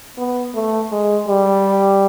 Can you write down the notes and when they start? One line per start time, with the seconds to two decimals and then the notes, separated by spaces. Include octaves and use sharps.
0.18 B3
0.55 A3
0.92 G#3
1.28 G3